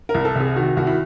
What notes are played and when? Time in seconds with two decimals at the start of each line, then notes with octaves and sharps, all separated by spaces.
0.09 A#4
0.14 C2
0.25 A4
0.36 C3 G#4
0.56 D#3 F#4
0.77 C2 F#4
0.87 E4